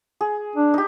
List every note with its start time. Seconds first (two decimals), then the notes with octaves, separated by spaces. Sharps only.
0.21 G#4
0.56 D4
0.74 D#4 G4